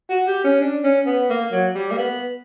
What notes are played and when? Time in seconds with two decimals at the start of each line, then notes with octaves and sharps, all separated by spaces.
0.10 F#4
0.28 G4
0.44 C#4
0.61 D4
0.84 C#4
1.06 B3
1.30 A#3
1.52 F#3
1.75 G3
1.91 A#3
1.98 B3